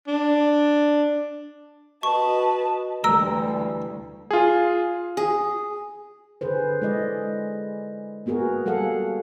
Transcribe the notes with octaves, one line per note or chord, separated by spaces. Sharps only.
D4
F#4 B4 D#5 A5 C#6
D2 D3 E3 G3 A#4 E6
F4 G#4
G#4
D3 G#4 B4 C5
G#3 E4 D5 D#5
A#3 B3 F#4 G#4 A#4
G3 G#4 A4 F5 F#5